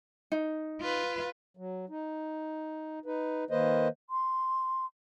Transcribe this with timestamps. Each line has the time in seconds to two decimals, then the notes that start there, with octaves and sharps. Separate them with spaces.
0.32 D#4
0.81 F4 B4
1.57 F#3
1.89 D#4
3.06 D#4 B4
3.51 D#3 A#3 B4 C5 D#5
4.10 C6